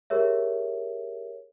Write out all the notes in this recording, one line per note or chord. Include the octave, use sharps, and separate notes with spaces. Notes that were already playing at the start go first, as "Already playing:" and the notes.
G4 G#4 A#4 C#5 E5